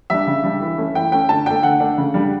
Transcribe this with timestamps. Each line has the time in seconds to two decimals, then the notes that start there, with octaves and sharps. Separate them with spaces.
0.10 G3 D4 E5
0.27 C#3
0.44 G3 D4
0.61 E3
0.78 A3 C#4
0.95 E3 G5
1.12 A3 C#4 G5
1.29 D3 A5
1.46 A3 D4 G5
1.63 D3 F#5
1.80 A3 D4
1.98 C#3
2.14 G3 D4